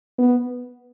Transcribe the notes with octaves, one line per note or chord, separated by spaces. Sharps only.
B3